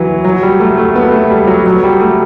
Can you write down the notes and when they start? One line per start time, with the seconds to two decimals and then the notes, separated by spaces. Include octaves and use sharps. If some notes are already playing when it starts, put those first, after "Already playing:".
Already playing: E3 F#3
0.24 F#3
0.43 G3
0.60 A3
0.78 A3
0.96 B3
1.12 A3
1.30 G3
1.47 F#3
1.66 F#3
1.84 G3
2.00 A3